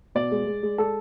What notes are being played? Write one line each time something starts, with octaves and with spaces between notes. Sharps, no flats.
B2 D5
G#3
G#3
G#3
G#3 A4